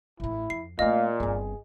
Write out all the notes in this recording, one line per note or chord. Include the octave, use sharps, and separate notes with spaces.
A1 A2 E4
F2 C7
A#2 A3 C4 D#5 F5
G1 C4 G#4